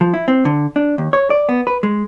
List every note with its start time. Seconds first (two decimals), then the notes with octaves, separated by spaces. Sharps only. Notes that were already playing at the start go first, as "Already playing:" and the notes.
0.01 F3
0.14 E4
0.28 C4
0.45 D3
0.76 D4
0.98 D#2
1.13 C#5
1.30 D5
1.49 B3
1.67 B4
1.83 G#3